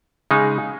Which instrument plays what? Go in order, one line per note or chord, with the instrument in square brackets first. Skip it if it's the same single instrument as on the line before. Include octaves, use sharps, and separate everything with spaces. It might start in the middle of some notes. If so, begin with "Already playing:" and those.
[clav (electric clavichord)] C#3 G#3 D#4